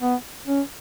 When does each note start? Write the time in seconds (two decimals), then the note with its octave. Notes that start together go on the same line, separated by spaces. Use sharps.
0.01 B3
0.47 C#4